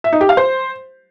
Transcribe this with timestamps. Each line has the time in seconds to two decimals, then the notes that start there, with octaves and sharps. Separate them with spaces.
0.04 E5
0.13 D#4
0.21 G4
0.29 F5
0.37 C5